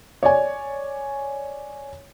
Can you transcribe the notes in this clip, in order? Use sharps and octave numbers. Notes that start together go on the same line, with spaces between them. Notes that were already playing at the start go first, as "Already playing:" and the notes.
C#5 D5 G#5